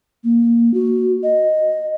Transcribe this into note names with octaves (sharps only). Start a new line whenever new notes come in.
A#3
F#4
D#5